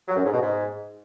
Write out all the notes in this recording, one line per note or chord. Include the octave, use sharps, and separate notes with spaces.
F#3
F#2
G#2
B2
G#2